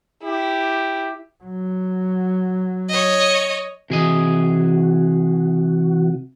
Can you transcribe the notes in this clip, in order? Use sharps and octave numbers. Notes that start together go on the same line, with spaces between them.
E4 G4
F#3
C#5 D#5
C3 E3 F#4 G#4 D#5